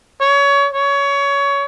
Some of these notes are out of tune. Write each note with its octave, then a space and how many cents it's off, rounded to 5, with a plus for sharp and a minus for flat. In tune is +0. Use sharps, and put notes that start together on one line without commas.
C#5 +25
C#5 +20